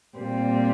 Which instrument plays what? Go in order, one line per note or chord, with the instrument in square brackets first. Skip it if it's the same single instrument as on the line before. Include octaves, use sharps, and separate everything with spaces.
[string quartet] A#2 G3 C4